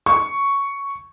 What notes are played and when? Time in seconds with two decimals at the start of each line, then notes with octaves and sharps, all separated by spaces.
0.06 C#6